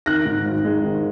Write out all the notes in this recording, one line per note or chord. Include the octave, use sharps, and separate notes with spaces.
D#3 F#6 A#6
G#2
G#1
G#3
D#3